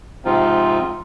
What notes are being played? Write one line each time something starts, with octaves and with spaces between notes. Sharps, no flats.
G#2 C3 F3 C4 D#4 F4